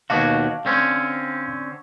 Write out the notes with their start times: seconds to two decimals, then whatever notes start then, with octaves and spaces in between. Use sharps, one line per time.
0.10 D#2 B2 F#4 F5 A5 D6
0.65 D3 C4 C#4